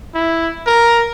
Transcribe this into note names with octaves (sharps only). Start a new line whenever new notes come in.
E4
A#4